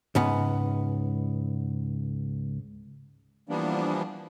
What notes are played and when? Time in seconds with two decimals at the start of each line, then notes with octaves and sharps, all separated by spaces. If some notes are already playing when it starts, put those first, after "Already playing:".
0.15 C#2 G#2 B3
3.49 E3 F3 G3 A#3 B3 D4